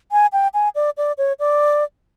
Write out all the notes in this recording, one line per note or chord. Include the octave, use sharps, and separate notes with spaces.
G#5
G5
G#5
D5
D5
C#5
D5